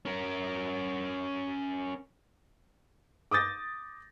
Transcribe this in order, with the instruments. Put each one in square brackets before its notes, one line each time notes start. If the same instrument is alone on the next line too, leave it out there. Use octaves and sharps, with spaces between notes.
[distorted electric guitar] C#4 A#4
[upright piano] D6 D#6 G6 A6 A#6